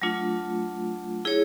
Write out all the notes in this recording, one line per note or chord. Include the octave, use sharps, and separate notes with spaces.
F#3 A3 D4 F4
E4 G#4 C#5